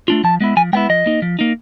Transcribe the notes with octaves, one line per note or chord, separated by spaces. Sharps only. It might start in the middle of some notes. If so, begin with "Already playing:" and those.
A3 D4 F4
F3 A5
G#3 B3 E4
F3 G#5
G#3 B3 E4 G5
F3 D#5
A#3 D#4
F3
A#3 D#4